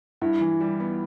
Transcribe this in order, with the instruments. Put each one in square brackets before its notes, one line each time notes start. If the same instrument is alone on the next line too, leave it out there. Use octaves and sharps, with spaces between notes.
[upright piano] G2 [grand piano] E4
[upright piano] E3
G3
B3